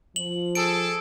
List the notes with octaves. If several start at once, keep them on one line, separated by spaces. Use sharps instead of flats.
F3 F#7
G#4 A4 D7